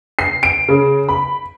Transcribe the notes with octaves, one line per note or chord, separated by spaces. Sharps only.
C7
D7
C#3
B5